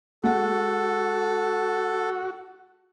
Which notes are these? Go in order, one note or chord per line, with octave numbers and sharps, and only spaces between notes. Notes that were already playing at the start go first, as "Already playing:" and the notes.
G#3 F#4 A4 F#5